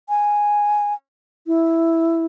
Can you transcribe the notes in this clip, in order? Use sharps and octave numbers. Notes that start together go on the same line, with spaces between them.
G#5
E4